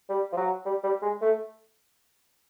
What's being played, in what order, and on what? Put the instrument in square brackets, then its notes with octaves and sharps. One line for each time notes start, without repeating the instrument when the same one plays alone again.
[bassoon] G3
F3
F#3
G3
G3
G#3
A3